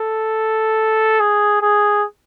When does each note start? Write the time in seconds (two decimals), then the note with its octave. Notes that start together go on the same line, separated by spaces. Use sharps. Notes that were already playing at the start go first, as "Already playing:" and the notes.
Already playing: A4
1.20 G#4
1.62 G#4